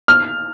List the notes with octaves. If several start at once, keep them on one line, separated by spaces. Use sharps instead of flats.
F6